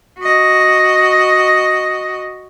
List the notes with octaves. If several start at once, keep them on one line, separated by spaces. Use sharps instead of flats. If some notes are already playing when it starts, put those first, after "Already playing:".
F#4 D#5